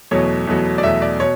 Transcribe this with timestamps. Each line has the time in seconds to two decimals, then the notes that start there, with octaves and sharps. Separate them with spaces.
0.11 E2 B2 F#3 A3 C#5
0.47 E2 B2 F#3 A3
0.78 D5
0.83 E2 B2 F#3 A3 E5
1.02 D5
1.20 B2 C#5